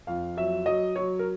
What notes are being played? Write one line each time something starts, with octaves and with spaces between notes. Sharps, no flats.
F2 F5
F#3 E5
F#3 D#5
F#3 C#5
A#4